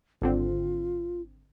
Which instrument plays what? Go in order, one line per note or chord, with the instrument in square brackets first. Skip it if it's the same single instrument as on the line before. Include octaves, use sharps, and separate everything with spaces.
[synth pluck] G#1 D3 C4 [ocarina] F4